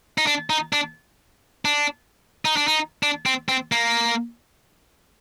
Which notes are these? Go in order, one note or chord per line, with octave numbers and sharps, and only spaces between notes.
D#4
D4
D#4
D4
D4
D#4
D4
D#4
D4
C4
C4
A#3